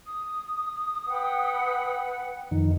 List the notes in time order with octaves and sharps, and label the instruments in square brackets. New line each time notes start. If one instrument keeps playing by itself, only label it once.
[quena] D#6
[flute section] B4 F#5 G5
[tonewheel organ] F2 D#3